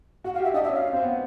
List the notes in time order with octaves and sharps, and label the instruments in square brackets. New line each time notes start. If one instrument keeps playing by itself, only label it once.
[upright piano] F#4 [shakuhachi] F#5
[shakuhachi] F5
[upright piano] G4 [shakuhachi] E5
[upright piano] D4 [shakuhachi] D#5
[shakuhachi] E5
[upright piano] C#4 [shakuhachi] F5
[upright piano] C4
B3